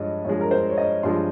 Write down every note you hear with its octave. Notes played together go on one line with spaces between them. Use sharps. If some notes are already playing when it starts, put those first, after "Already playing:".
Already playing: G2 F3 G#3 C#5 D#5
G2 F3 G#3 C#5
A#4
C5
C#5
D#5
G2 F3 G#3 C6